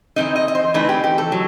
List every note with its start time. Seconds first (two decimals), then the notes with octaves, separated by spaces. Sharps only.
0.16 E3 A3 C4 D#4 D#5
0.36 D#5
0.48 D#5
0.55 C5
0.74 E3 A3 C4 D#4 B4
0.89 G4
1.04 G4
1.18 A4
1.32 F#3